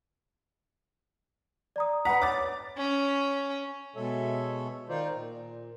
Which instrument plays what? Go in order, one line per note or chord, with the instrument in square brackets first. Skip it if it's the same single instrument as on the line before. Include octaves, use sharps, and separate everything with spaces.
[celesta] D5 A#5 D#6
[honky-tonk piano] B4 F#5 A#5 [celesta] B5 B6
[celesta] C#5 [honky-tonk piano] D6 A6
[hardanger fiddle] C#4
[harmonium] B2 G#3 A4 C#5 E5
D#3 D#4 F4 C5 D5
A#2